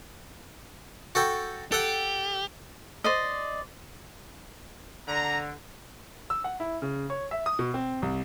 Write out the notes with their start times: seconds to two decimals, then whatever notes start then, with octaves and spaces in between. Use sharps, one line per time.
1.15 F#4 A4 G5
1.72 G4 A4 F#5
3.04 C5 D5 D#5
5.08 D3 A#5
6.30 E6
6.44 F#5
6.60 E4
6.82 C#3
7.10 C#5
7.31 E5
7.46 D#6
7.59 B2
7.74 C4
8.02 C2